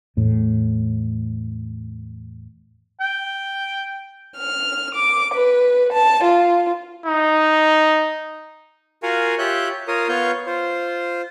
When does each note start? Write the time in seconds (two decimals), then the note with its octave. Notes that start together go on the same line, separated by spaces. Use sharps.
0.17 E2 A2
3.01 G5
4.37 F6
4.95 D6
5.35 B4
5.92 A5
6.23 F4
7.06 D#4
9.03 F4 F#4 A#4 F5 F#5 G#5
9.38 F4 G4 C#5 E5 F#6 G6
9.88 F4 A#4 C#5 F5 D#6
10.09 B3 F4 C#5 F5 C#6 G6
10.46 F4 C5